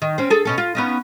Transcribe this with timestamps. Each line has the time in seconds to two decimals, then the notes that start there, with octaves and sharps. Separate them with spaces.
0.02 D#3
0.18 C4 C#4
0.30 G#4 A4
0.45 B2 C#4 A4
0.58 F4
0.75 B3 C#4 D#4